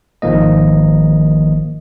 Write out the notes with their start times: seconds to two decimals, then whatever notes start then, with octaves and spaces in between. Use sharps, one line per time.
0.22 G#1 D#3 F3 A#3 D#5